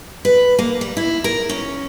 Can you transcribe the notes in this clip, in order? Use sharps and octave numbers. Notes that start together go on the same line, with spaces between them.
B4
A#3
G3
E4
A#4
C#4